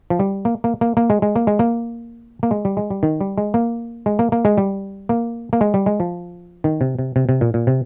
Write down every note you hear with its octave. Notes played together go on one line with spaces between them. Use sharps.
F3
G3
A#3
A#3
A#3
A#3
G#3
G#3
A#3
G#3
A#3
A#3
G#3
G3
G#3
G3
D#3
G3
G#3
A#3
G#3
A#3
A#3
G#3
G3
A#3
A#3
G#3
G3
G#3
F3
D#3
C3
C3
C3
C3
A#2
A#2
C3